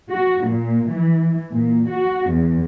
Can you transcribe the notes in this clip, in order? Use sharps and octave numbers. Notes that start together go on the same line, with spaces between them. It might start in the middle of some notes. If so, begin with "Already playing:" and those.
F#4
A#2
E3
A#2
F#4
E2